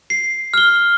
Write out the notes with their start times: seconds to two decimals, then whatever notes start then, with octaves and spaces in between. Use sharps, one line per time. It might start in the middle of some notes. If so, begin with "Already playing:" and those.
0.10 C7
0.54 F6 G7